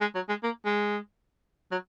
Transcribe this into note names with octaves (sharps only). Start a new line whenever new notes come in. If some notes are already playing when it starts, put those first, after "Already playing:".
G#3
F#3
G#3
A#3
G#3
F#3